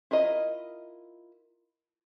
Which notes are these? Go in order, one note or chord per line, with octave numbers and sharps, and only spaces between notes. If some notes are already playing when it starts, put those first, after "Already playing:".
E4 F4 A#4 D#5